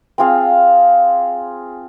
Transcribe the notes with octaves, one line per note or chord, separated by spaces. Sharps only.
C4 F4 G#4 F5